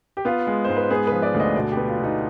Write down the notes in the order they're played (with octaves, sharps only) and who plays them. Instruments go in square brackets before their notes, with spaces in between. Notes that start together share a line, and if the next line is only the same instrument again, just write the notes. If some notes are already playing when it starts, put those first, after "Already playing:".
[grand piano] G4
B3 F4
G#3
G#2 C5
B4
B3 G#4
F3 B4
D5
D2
D#5
B2 D5
G4
B3
F4
B2 D#4